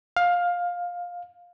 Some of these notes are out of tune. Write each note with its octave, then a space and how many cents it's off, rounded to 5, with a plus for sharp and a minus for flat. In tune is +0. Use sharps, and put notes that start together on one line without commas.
F5 +15